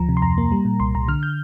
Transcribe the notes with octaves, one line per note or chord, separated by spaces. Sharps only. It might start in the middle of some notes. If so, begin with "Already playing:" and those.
Already playing: D2 F3 A#5
C3
C6
F2 A#5
A#3
G3
A#2
C2 C6
C2 A#5
D3 F6
G6